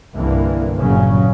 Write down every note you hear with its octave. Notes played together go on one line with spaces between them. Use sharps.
C2 G2 D3 E3 A#3
G1 A#2 C#3 F#3 C#4